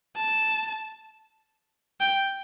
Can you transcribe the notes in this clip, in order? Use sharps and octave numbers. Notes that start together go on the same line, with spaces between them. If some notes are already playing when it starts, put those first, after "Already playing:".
A5
G5